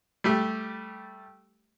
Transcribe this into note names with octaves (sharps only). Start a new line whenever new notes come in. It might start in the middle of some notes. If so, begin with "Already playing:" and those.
G3 A3 G4